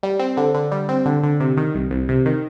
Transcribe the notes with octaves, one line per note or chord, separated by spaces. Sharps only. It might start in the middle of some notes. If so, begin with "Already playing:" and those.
G3
C4
D3
D3
G3
C4
D3
D3
C3
D#3
C2
C2
C3
D#3